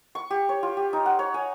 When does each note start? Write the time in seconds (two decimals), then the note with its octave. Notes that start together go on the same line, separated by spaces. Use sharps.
0.15 C#6
0.30 G4
0.49 C#5
0.63 F4
0.77 G4
0.93 D#4
1.06 F#5
1.19 C#5
1.34 G#5